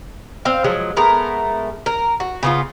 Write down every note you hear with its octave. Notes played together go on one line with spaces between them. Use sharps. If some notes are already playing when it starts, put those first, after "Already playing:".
C4 F5
F3 F#3 G#3
G#3 A3 B3 A#4
A#4
F#4
C#3 B3 F4